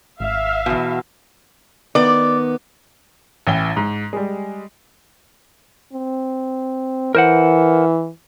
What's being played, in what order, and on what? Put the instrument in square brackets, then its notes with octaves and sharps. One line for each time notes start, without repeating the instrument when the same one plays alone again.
[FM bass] G#1 [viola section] E5 F5
[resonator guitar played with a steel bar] E2 B2
[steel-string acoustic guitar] D#3 B3 [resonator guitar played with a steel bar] D5
[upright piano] A1 E3 G5 G7
G#2
G3 G#3
[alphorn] C4
[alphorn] E3 [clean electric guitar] A#4 C5 F#5